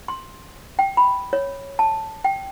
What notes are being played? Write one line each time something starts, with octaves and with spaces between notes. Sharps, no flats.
C6
G5
B5
C#5
A5
G5